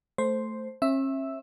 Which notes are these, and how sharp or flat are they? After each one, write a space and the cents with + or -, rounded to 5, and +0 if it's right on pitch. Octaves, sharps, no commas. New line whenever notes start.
A3 +0 C5 +0
C#4 -45 E5 +0